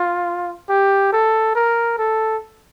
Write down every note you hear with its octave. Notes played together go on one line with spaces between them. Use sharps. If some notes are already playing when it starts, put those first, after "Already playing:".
Already playing: F4
G4
A4
A#4
A4